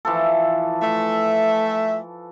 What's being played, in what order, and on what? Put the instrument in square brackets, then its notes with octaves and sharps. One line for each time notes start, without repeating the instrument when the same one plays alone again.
[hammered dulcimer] E3 F3 A4
[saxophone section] A3 E5